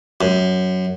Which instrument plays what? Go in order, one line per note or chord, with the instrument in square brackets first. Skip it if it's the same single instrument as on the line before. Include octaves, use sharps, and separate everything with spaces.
[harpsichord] F#2